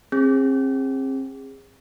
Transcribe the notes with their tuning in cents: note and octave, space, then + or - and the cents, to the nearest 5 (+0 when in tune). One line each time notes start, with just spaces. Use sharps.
C4 +35 G#4 -25